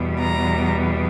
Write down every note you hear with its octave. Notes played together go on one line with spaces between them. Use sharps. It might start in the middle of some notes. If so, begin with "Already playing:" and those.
Already playing: E2 B2 G3 B3
A#5